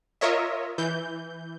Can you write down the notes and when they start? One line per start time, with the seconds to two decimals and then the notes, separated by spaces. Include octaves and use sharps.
0.21 F4 A#4 C#5 D#5 E5
0.78 E3 G6